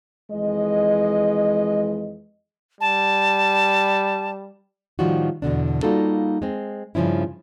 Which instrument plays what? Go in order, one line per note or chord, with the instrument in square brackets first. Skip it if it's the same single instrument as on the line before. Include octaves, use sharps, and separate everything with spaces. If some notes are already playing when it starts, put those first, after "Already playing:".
[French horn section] F2 E3 G#3 D#5
[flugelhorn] G3 [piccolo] A5
[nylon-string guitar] A2 D#3 F3 G3 F4 F#4
E2 B2 D3 D4
G3 A#3 D#4 F4 F#4 A4
G#3 C4
G2 C#3 F3 C#4 E4